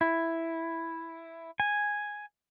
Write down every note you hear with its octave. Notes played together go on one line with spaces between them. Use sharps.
E4
G#5